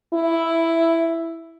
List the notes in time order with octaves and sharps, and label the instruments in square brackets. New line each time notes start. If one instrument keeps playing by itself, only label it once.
[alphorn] E4